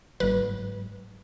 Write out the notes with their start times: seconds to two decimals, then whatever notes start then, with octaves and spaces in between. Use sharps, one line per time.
0.20 G1 G#2 F#3 B4